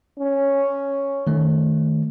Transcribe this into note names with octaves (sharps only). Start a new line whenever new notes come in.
C#4
D#3 A3